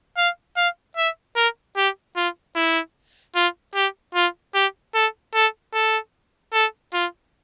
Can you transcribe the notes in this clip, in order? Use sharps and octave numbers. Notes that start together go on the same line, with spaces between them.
F5
F5
E5
A#4
G4
F4
E4
F4
G4
F4
G4
A4
A4
A4
A4
F4